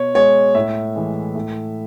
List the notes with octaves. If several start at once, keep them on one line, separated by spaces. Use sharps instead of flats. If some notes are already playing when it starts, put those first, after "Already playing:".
Already playing: B2 C#5
G#3 C#5
A2 E5
E3 G#3
A2